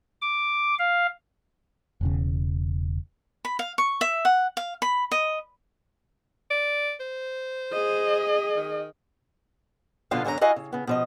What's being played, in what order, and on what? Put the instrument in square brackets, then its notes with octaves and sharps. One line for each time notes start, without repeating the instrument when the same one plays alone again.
[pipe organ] D6
F5
[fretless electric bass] E1 E2 C#3
[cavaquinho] B5
F5
C#6
E5
F#5
F5
B5
D#5
[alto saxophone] D5
C5
[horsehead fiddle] G#4 D#5
[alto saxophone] D#3
[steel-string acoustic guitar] B2 D3 F3 F4 F5
F#2 D3 C#4 A#4 A#5
E4 F#4 D#5 F5 G#5
C#3
C#3 B3
B2 F3 D#5